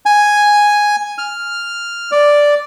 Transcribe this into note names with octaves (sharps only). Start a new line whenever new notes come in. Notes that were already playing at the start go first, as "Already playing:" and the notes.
G#5
F6
D5